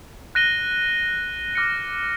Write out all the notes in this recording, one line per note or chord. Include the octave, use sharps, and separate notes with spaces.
F#6 A#6 D#7 G7
D6 F6 A#6 C#7